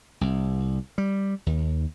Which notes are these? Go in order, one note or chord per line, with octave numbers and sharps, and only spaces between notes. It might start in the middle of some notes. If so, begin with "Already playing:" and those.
C2
G3
D#2